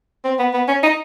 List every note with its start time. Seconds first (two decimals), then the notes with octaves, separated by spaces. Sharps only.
0.24 C4
0.39 B3
0.53 B3
0.68 C#4
0.83 D#4